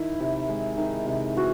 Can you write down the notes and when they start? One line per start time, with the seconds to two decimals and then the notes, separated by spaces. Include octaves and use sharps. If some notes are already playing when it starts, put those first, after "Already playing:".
Already playing: D#3 E4
0.20 C3
0.48 G#3
0.77 D#3
1.06 C3
1.37 E3 F#4